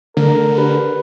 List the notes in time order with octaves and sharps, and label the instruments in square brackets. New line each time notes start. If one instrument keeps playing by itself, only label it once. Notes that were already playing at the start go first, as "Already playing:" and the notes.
[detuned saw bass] D3 [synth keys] A3 [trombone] A#4
[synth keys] G4 [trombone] B4